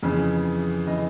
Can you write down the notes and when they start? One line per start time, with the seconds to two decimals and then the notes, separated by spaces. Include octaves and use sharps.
0.03 F2 C#3 E3
0.87 C#3 E3 D#5